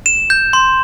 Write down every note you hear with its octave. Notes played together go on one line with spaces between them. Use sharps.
E7
G6
C6